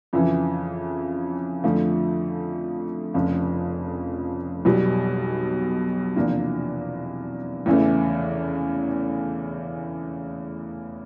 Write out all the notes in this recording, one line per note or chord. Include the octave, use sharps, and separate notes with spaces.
F2 C#3 E3
F2 D3 F3 A3
F1 F2 C#3 F3
B1 B2 G3
E2 C3 F3 A#3 D4
E2 C#3 E3 A3